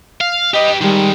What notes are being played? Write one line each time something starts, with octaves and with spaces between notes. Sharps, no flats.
F5
G4 B4 D#5
D#3 G3 G#3